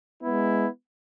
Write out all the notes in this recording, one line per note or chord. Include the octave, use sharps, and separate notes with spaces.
G#3 B3 E4